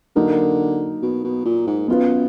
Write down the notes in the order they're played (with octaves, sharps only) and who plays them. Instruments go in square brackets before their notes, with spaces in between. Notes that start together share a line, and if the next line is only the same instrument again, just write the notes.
[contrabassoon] D3 [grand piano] F#3 A#3 D#4 A#4
[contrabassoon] B2
B2
A#2
G#2
[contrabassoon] F#2 [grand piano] B3 F4 B4